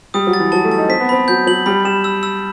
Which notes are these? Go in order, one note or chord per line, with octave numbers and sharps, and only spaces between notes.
G3 D#6
F#3
A6
E3
F#3 A5
A3
A5
D#4
C4 B6
B3
C4 B5
F#3 G6
F#3 F#7
G3 B5
G3 E7
E6
E6